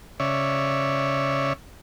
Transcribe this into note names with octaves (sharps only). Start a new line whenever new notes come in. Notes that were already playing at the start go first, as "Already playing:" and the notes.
C#3 C#5 D5 E5